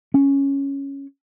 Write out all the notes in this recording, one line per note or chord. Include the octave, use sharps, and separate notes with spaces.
C#4